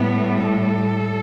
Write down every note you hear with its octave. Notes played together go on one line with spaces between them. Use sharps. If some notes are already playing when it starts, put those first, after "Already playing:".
Already playing: A2 G3 B3
A4